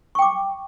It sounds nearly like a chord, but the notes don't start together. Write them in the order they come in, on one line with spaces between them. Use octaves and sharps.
C#6 G5 D6